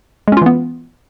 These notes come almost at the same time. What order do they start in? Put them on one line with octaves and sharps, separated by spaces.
G#3 C#4 F4 E3 B3